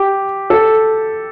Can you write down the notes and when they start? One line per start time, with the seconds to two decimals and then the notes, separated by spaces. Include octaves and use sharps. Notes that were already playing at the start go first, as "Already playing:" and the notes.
Already playing: G4
0.50 A4